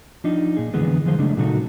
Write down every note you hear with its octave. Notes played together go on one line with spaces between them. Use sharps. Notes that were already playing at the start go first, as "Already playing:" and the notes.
F3 D4 D#4
A#2 G#4
F2 D3 E3 G#3 B3
D#3 F3 G#4 C5
C#3 G#3 A3 D4
A#2 C#3 F#3 D#4 F#4 A4